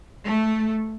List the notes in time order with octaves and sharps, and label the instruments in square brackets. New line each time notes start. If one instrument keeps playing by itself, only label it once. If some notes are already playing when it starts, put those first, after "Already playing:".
[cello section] A3